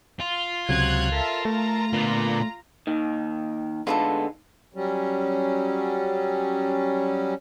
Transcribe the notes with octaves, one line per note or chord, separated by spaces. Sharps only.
F4
C#2 C3 F#3 F#6 G#6
A4 A#4 E5 F5 A5
A3 F4 A#5
A#2 D3 B3
D#2 D#3 D#4
D3 G#3 B3 F4 G#4 A4
F#3 G3 C#4